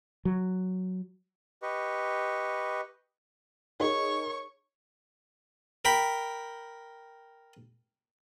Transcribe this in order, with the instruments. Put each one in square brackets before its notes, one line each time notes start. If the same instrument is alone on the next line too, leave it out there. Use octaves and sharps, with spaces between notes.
[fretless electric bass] F#3
[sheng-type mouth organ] G4 B4 D#5 C#6
[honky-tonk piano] D#4 G#4 A#4 [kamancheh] C#5 C#6
[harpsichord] A#4 G5 B5